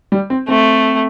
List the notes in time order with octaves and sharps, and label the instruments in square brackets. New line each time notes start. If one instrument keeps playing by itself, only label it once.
[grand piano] G3
C4
[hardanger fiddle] A3 [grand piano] C4